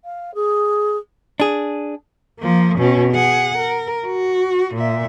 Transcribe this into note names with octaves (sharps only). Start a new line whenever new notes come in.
F5
G#4
D4 G#4
F3 A#3
B2 C#4
G#4 F#5
A#4
F#4
A#2 E5